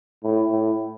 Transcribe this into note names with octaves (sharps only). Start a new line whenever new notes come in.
A2
A2